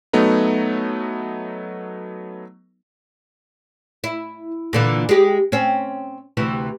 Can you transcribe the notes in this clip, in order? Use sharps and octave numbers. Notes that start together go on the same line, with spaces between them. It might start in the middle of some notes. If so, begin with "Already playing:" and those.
F#3 A3 B3 D#4
E4
A#2 D3 E3
G#3 G4
C4 C#4
D2 C3 E3